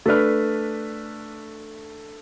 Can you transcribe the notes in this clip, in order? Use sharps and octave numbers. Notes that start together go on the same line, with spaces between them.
A3 D4 B4 F6